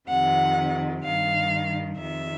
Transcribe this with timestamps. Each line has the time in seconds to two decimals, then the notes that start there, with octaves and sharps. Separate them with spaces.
0.09 F2 C3 D#3 F#5
1.04 G2 D#3 F5
1.98 F2 C3 D#3 E5